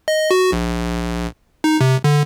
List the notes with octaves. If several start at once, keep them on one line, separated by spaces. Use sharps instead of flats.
D#5
F#4
A#1
D#4
C3
D3